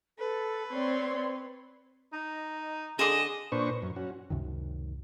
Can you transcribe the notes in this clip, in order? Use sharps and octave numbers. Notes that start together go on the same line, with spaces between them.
A4 B4
C4 C#5 D5 C6
D#4 D#5
D3 G#4 D#5 C6 D6 E7
A#2 D4 B4 C5 C#6
F#2
C#4 F#4
C#2 F#2 C3 D#3